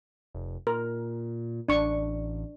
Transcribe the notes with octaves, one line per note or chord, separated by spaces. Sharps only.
F1
A#2 A#4
A1 D4 C#6